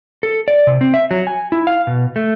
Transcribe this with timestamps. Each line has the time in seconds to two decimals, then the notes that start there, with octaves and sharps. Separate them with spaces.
0.23 A4
0.48 D5
0.67 C3
0.81 C4
0.94 E5
1.11 F#3
1.27 G#5
1.52 E4
1.67 F5
1.87 B2
2.16 A3